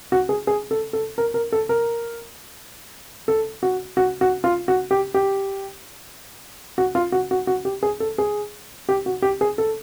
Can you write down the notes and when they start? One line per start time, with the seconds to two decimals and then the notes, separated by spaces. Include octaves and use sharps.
0.12 F#4
0.29 G#4
0.47 G#4
0.71 A4
0.93 A4
1.18 A#4
1.34 A#4
1.52 A4
1.69 A#4
3.28 A4
3.63 F#4
3.97 F#4
4.21 F#4
4.44 F4
4.68 F#4
4.91 G4
5.14 G4
6.78 F#4
6.95 F4
7.12 F#4
7.31 F#4
7.47 F#4
7.65 G4
7.83 G#4
8.00 A4
8.18 G#4
8.89 G4
9.06 F#4
9.22 G4
9.41 G#4
9.58 A4